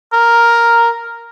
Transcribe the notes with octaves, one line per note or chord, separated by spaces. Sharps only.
A#4